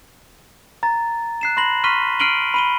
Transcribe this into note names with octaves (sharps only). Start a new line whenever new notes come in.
A#5 A6
F#6 C7 E7
B5 C6 A#6 F#7
C6 C#6 F6 B6 D#7 G7
F6 C7 D7 D#7 F#7 G7
B5 D#7 G7